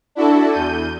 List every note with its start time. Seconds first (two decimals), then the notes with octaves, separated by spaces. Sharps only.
0.15 D4 E4 F#4 A4
0.52 E2 G6 D#7